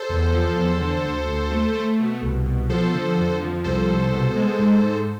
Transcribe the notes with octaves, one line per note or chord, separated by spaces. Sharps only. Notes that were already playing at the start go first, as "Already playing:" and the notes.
Already playing: A4 C5
E2
F3
E2
D3
D2
D2
A3
A3
B2
C2
B2
F3 A4 C5
D3
F2
F3
C2 A4 C5
C2
B2
G#3
G#2
G#2